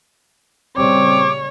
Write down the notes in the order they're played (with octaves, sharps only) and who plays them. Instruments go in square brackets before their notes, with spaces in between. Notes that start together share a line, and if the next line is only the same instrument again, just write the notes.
[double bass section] A#2 C#3 G3 [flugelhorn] C4 [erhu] C#5 [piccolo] D6